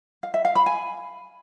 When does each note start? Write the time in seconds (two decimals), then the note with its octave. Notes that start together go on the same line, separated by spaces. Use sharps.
0.23 F5
0.34 E5
0.45 F5
0.55 B5
0.66 G#5